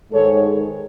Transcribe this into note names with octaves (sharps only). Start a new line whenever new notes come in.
G#2 D#3 G#3 A4 C#5